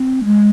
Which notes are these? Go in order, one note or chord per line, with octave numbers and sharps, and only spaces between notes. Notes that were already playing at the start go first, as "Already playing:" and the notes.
Already playing: C4
G#3